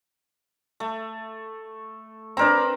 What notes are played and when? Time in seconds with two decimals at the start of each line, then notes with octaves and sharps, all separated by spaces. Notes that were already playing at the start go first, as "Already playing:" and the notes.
0.80 A3
2.37 C4 D4 A#4 B4 A#5